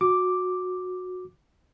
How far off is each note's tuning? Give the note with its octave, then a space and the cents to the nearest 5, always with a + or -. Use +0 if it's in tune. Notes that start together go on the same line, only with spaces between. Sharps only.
F#4 -20 D6 +0